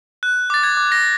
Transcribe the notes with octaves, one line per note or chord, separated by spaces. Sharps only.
F#6
D6 A6
G#6
D6
A#6